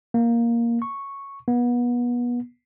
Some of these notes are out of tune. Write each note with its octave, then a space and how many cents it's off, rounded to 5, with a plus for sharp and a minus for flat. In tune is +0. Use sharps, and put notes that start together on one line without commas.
A#3 +5
C#6 -5
B3 -30